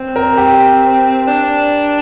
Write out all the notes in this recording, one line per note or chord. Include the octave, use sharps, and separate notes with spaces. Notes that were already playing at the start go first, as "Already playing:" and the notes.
Already playing: C4
A#4
G4
D4